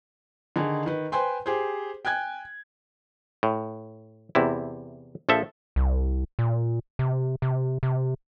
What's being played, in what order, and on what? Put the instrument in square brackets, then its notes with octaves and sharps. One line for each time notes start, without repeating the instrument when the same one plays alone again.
[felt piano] D3 D#3 D#4 G#4
D#3 B4
B4 C5 G5 G#5 C6
G4 G#4 C5
G5 G#5 F#6 G#6
[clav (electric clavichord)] A2
E2 C3 E4
A#1 F3 A4 E5
[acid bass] C2
A#2
C3
C3
C3